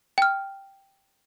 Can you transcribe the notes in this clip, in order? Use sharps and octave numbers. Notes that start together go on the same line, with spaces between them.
G5 F6